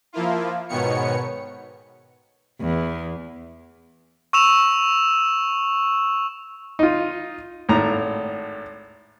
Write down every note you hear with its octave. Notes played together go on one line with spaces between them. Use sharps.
F3 A#3 E4 F4
G#2 B2 D#3 B3 C#5 C#7
E2
C#6 E6 E7 F7
D#4 F4
G#1 A2 A#5